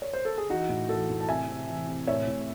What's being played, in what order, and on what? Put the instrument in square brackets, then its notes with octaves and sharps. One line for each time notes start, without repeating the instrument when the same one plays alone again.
[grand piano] C#5
C5
A4
G#4
E3 D#4 F#4
A2
E3 F#4 A4
A2
A5
C3 E5 G#5
C3
E3
C3
A2 C#5 E5
A2